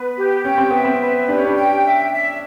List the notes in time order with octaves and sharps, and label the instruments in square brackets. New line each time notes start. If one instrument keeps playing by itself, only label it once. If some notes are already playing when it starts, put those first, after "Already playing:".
Already playing: [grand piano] B3 [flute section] B4
[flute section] G4
[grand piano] C#4 [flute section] G5
[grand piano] C4
[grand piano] B3 [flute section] E5
[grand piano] C4
[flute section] B4
[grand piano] D4 [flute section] G4
[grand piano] C#4
D4
[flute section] G5
E5
E5